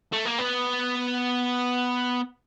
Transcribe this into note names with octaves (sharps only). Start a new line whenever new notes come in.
A3
A#3
B3